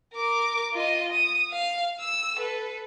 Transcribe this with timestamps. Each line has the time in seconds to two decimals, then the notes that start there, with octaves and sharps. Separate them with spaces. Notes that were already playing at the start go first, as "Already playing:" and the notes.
0.14 A#4 D6
0.73 F4 D#5
1.12 D#6
1.52 F5
2.00 E6
2.36 A4 B4